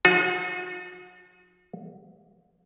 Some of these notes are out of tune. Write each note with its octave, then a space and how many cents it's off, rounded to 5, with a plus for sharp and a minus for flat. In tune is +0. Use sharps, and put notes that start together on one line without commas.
F3 +45 D#4 +30 F#4 -40